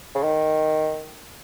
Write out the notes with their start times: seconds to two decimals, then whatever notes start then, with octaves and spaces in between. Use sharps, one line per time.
0.15 C#3
0.24 D#3